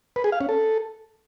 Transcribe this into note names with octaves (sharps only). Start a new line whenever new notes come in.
B4
G#4
F5
C#4
A4